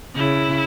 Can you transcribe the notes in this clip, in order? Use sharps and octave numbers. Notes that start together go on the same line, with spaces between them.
C#3 E4